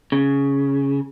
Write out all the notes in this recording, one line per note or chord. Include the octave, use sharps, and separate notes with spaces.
C#3